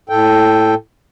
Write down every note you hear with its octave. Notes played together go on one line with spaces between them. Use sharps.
A2 A4 G5